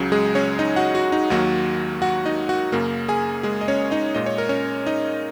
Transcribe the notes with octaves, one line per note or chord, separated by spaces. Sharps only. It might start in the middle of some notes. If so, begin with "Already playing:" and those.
Already playing: C#2 C#3 F#3
G#3 G#4
C#4 C#5
D#4 D#5
F#4 F#5
F#4
D#4
D#2 D#3 F#3 A#3 F#4
F#4 F#5
D#4 D#5
F#4 F#5
F#2 C#3 A#3 A#4
G#4 G#5
G#3 G#4
D#5
C#4 C#5
D#4 D#5
A#2 G#3 D#5
C#5
A#4
C#4 C#5
D#4 D#5